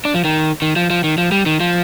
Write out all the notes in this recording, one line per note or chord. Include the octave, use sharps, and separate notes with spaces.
D4
F3
D#3
D#3
F3
F3
D#3
F3
G3
D#3
F3